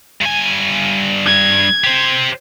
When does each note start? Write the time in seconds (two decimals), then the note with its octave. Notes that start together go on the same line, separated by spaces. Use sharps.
0.21 G2 G#5
1.26 G#6
1.84 G4 C5